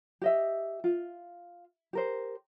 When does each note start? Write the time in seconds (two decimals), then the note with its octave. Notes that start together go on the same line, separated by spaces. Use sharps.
0.21 G4 D#5 E5
0.84 F4
1.93 G4 A#4 C5